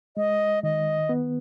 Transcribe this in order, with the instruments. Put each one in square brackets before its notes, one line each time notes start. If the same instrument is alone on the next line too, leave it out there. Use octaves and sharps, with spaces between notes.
[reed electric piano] G#3 [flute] D#5
[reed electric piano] D#3 [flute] D#5
[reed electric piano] B3